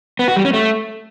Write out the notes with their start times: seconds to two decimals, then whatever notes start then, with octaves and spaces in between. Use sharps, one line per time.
0.19 B3
0.28 F#4
0.36 G3
0.45 C#4
0.53 A3